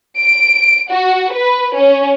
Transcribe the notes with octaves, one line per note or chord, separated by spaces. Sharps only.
D7
F#4
B4
C#4